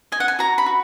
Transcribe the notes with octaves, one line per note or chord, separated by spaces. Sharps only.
D#5 G#5
F#5
G#5
F#4 A#5
B5
F#4